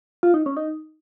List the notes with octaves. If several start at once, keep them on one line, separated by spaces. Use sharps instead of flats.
F4
D#4
C#4
D#4